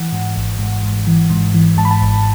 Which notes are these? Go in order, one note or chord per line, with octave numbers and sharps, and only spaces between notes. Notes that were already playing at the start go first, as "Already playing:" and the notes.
Already playing: E3 F#5
G#2
G#1
G#2
G#2
E3
G#2
E3
G#2 A5
B5
A5
G#1